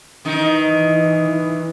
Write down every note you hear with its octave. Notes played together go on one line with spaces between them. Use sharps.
D#3 E3 D#4